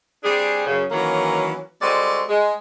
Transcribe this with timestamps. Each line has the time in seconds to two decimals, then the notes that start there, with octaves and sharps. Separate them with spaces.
0.24 G3 C4 D4 G#4
0.66 F#2 C#3
0.90 D#3 E3 F#3 A#3 C#4
1.81 G3 G#3 C4 F#4 A4 D5
2.28 G#3